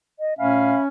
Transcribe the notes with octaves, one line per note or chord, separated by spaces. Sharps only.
D#5
A#2 A3 C#4 E5 F5 G#5 B5